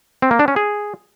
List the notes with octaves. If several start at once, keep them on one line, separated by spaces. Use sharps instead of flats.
C4
A#3
D4
C#4
G#4